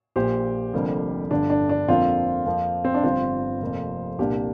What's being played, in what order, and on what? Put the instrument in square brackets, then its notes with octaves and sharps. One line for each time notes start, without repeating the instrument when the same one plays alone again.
[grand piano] A#1 A#2 A#3 G4 C5
F1 F2 D3 G3 A#3
G1 G2 D3 D4
D4
D4
F2 D3 F3 A#3 C4 F4
F2 F3 A#3
C4
D4
G1 G2 F3 C4 F4
F1 F2 F3 A#3
C2 A#2 A#3 D4 G4